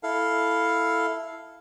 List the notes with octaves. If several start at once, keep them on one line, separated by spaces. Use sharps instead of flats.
E4 A4 F5